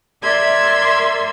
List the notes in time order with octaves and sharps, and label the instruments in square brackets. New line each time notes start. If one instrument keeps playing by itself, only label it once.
[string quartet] A#4 D5 E5 C6 E6 G#6